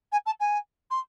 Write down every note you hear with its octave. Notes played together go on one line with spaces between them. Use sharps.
G#5
A5
G#5
C6